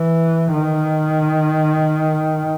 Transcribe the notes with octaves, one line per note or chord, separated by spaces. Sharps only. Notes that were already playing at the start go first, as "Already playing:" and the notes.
Already playing: E3
D#3